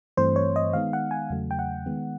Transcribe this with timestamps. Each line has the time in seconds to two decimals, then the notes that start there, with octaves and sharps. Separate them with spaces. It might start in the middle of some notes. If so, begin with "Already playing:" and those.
0.17 G2 E3 A3 C4 C5
0.36 C#5
0.56 D#5
0.73 D#3 G#3 B3 D#4 F5
0.93 F#5
1.11 G#5
1.30 E2 C#3 F#3 A3
1.51 G5
1.59 F#5
1.86 D#3 G#3 B3